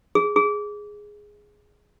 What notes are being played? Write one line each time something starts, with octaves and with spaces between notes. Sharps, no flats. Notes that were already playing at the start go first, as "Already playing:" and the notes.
G#4
G#4